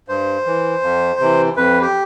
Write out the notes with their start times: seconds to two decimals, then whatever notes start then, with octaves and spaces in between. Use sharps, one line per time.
0.08 G2 C5
0.46 E3
0.83 F2
1.20 C3 E3
1.57 F2 B4
1.81 G4